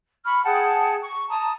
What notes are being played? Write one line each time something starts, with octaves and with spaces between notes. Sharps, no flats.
B5 C#6 F6
G#4 F#5 G5 A5
C#6
A5 A#5 D#6